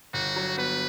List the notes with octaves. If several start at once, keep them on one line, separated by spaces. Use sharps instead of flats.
G1 F#4
F#3
B3 B4